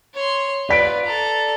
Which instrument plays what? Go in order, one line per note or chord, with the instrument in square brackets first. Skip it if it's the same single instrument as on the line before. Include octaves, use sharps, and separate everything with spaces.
[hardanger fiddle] C#5 C6
[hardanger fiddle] F4 B4 [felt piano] D5 B6 D7
[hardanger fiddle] A4 A#5